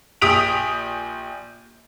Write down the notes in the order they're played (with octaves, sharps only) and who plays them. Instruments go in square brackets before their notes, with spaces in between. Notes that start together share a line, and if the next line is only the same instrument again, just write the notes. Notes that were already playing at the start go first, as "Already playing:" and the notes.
[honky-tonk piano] A#1 G4 D#6 B6 D7 F7